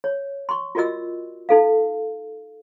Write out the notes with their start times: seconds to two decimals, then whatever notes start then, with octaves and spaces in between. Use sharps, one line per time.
0.04 C#5
0.49 C6 C#6
0.75 F4 F#4 A#4 D5 D#5 E6
1.49 D#4 A4 F5